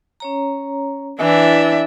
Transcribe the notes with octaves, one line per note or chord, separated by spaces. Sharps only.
C#4 C#5 A#5
E3 D4 E4 B4 E5